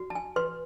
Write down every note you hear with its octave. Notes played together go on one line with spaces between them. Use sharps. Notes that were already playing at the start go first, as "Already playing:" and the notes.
Already playing: F#4
A5
G#5
B4 C6